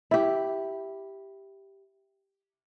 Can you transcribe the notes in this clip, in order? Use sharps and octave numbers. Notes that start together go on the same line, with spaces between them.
E4 G4